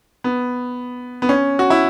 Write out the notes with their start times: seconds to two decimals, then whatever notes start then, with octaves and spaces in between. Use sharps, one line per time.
0.24 B3
1.22 B3
1.29 C#4
1.59 F#4
1.70 E4